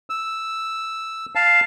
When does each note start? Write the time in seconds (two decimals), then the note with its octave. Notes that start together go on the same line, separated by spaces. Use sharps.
0.10 E6
1.35 F5 A5